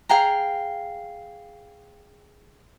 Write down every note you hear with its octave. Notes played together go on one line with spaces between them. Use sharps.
G#4 F5 G5 A#5